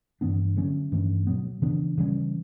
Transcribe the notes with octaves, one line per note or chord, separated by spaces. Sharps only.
G2 E3 B3 D4
D3 F#3 A3 C#4
G2 E3 A3 C#4
B2 F#3 B3
C#3 E3 B3 D4
C#3 E3 G3 C#4